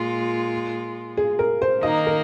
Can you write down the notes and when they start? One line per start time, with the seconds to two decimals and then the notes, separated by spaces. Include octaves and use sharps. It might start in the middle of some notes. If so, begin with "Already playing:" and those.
Already playing: A#2 G#3 F4
1.17 G#4
1.39 A#4
1.62 C5
1.82 D#3 A#3 D#4 D#5
2.07 A#4